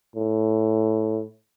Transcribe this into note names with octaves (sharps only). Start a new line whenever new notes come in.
A2